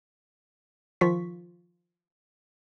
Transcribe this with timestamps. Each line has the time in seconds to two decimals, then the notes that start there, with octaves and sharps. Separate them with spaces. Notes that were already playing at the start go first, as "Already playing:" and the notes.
1.01 D#3 F3 F4 C#6 B6